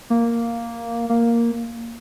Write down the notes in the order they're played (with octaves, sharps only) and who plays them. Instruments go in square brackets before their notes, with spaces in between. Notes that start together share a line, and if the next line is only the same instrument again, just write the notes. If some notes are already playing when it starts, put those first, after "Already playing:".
[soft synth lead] A#3
A#3